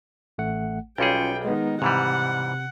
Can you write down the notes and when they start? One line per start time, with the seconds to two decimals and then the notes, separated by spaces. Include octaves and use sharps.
0.38 A1 A3 F#5
0.98 B1 G3 C#4 F4 G#4 G5 C#7
1.45 D#3 G#3 B3 D#4
1.82 G#2 C3 E3 G3 F#5